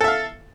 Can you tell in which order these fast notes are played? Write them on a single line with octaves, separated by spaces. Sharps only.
A4 E5 F5